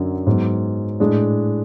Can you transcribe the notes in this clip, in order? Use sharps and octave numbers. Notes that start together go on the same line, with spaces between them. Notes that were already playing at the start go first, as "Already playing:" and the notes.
Already playing: F#2 D3 F#3
G#2 F#3 B3
A2 G#3 D4